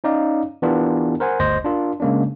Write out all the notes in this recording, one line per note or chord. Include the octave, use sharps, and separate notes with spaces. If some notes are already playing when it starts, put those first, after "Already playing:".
C#4 D#4 D5 F5
E3 B3 D4 F4 G4 A#4
A#4 C5 F#5 G#5
G1 D2 C5 D#5 A#6
D4 F4 A#4
C#3 G#3 A#3 C#4 D4